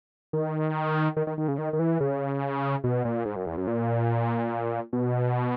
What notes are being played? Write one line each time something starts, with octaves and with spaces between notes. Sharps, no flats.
D#3
D#3
D#3
D#3
C#3
D#3
D#3
E3
C#3
B2
A#2
G#2
F#2
E2
F#2
A#2
B2